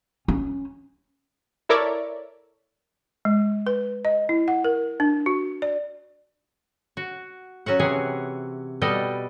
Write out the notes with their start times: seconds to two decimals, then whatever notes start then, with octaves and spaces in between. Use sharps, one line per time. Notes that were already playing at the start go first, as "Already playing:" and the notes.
0.28 C#4
1.69 E4 A4 A#4 C#5 D5 E5
3.25 G#3
3.67 B4
4.05 D#5
4.29 E4
4.48 F#5
4.64 A#4
5.00 D4
5.26 F#4
5.62 D5
6.97 F#4
7.66 F#3 C#4 F#4 F#5
7.79 C3 E3 C#4 G#4
8.82 B2 G3 A4 D5 D#5